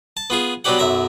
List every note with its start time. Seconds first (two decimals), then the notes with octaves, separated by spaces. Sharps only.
0.17 A5
0.30 B3 F4 G#4
0.64 B2 F#3 B3 D4 G4 F#5
0.79 B1 F#2 E5 A#5